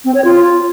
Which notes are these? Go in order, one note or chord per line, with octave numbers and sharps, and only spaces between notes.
C4
C#5
F4